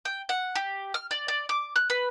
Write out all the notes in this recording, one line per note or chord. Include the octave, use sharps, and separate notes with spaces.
G5
F#5
G4
F6
D5
D5
D6
F#6
B4